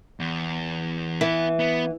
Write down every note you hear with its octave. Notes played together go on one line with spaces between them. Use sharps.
E2
E3 B3 B4
B3